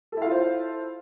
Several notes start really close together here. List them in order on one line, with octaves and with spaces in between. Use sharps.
A4 E4 F5 F4 C5